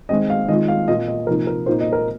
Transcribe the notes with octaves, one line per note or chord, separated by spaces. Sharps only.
D#3 G#3 C4 D#5
F5
D#3 G#3 F4 D#5
F5
A#2 A#3 F4 D#5
D#5
C3 F3 A#3 D#4 A#4
A#4
A#2 A#3 D#4 C5
D#5
A#4